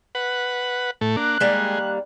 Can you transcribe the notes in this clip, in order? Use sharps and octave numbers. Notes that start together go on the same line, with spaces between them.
B4 F#5
A2 A3
A#3 D4 F#6
D#3 G3 G#3 A#3